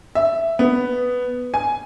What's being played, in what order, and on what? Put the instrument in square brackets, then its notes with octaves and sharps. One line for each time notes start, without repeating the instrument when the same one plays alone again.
[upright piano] E5
B3
G#5